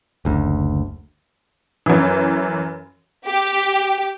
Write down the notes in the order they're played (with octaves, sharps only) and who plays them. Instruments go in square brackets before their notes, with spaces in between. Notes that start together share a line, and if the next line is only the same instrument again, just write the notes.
[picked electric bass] F#1 D2
[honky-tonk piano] F#2 E3
[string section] G4